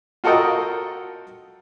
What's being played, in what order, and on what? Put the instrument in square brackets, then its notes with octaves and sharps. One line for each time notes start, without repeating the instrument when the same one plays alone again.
[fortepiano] F4 F#4 A4 A#4 D#5 G5